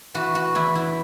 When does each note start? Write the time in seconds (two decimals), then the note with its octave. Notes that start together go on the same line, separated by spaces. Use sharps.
0.14 E3 F#4
0.35 F#4
0.55 E2 E4
0.75 E4